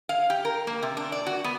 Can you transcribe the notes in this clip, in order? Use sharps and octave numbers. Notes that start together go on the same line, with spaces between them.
F5
G4
A#4
A#3
C3
D4
D5
F#4
B3